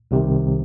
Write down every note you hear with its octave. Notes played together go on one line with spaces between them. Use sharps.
C2 C3 D#3